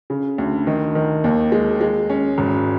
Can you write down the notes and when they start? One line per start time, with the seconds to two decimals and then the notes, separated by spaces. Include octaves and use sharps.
0.10 C#3
0.38 D2
0.67 D#3
0.95 D#3
1.24 D#2
1.52 G#3
1.81 G#3
2.10 C#4
2.38 G#1